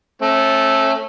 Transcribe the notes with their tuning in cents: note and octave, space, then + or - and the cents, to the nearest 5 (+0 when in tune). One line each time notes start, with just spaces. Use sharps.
A3 -5 C#4 -40